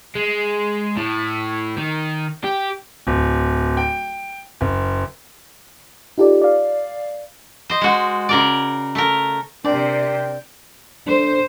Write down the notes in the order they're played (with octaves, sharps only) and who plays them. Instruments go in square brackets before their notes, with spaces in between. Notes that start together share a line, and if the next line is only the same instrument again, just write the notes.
[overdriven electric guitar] G#3
A2
D#3
G4
[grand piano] D1
G5
F#1
[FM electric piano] D#4 F4 G4 A4 D5
D5 F5
[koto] C5 D#5
G#3 F#4
C#3 A#4 D5
A3 A#4
[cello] C3 C4 [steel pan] D4 [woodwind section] A#4 G5 [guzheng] D5
[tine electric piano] D4 A4 [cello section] C5